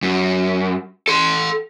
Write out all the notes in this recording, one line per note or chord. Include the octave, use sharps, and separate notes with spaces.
F#2
A4 C6